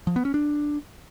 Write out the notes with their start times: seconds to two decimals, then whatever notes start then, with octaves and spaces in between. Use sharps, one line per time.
0.07 F3
0.16 B3
0.25 C#4
0.34 D4